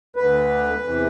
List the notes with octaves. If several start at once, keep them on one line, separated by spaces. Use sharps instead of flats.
D2 D3 B4
E2 C3 E3